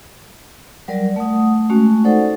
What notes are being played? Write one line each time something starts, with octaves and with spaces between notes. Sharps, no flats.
F#3 G3 A#4 D5
A3 F#5 D#6
G#3 A3 C#4 F#4
D#4 A4 C5 D5 F#5